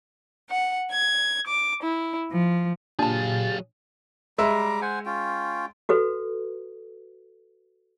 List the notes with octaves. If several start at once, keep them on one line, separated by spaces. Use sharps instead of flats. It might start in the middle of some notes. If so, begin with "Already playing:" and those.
F#5
G#6
D6
E4
F3
A#2 F#3 D4 G4 G#4 F5 A5 A6
G3 G#3 E5 A#5 D6
C5 F#5 G#5
C#4 F4 G5
F#4 A4 B4